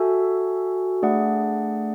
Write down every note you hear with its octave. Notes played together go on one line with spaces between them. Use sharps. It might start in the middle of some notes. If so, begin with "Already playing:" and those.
Already playing: F#4 A4 E5 G#5
A3 D4 G#4 D5 F#5